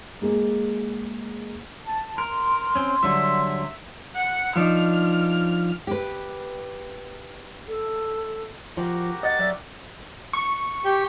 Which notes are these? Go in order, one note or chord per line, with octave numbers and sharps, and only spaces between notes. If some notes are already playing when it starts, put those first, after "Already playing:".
G#3 A#3 G#4
A5
A#4 C6
C4 C#4
D3 F#3 G3 E5
F#5
F3 D4 D#4 F6
G4 B4
A4
F3 F#4 G4 A#4
D#5 F#5 A6
F#3 D5 E5
C#6
G4